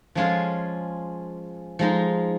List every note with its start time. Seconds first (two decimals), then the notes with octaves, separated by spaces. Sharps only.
0.15 F3 G#3 C#4 F4 G#4
1.79 F3 G#3 D#4